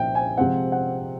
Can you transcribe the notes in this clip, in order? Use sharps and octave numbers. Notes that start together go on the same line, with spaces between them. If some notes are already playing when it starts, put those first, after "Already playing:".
Already playing: C2 A#2 F3 E5 G5
G#5
C3 F3 G#3 C4 F#5
F#5